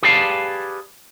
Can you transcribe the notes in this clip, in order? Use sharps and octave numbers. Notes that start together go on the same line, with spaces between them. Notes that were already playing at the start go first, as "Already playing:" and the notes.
G4 G#4 B4 D5 F5 A5